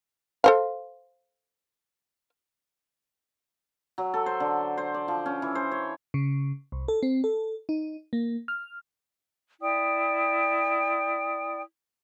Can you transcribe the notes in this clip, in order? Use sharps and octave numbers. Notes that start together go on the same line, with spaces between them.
A4 C5 F5
F#3
A4
C5
D3
C5
D5
F3
C#4
E3
C5
C#5
C#3
C2
A4
C4
A4
D#4
A#3
F6
E4 D5 G5 D#6